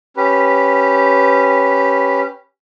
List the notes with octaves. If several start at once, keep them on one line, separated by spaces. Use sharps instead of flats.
C#4 G4 B4